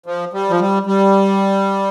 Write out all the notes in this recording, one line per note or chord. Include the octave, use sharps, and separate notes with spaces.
F3
G3
F3
G3
G3